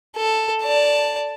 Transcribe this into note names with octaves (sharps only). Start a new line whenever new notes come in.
A4
D5 A5